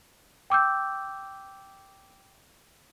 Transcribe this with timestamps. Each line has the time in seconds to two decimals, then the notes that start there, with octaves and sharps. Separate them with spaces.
0.50 G5 D6 E6 G6